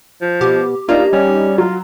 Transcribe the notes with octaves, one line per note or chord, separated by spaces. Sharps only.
F3
B2 G4
A#3 D4 D#4 F4
G3 C#4
F#3 F4